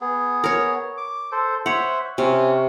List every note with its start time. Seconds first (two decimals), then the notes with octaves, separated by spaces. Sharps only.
0.01 B3 G#4
0.44 A#4 C#5
0.97 D6
1.32 A4 C5
1.66 C5 C#5 E5 F#5
2.18 C3 C4 C#4